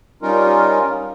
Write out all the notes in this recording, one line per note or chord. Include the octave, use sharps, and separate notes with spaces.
G3 C#4 D#4 F4 A#4